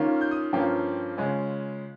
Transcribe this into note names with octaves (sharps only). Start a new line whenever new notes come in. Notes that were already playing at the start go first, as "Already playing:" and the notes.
Already playing: D#3 A#3 C#4 F4
G6
D#6
G2 F3 A#3 C#4 F4 G5
C#3 G#3 C#4 F4 G#5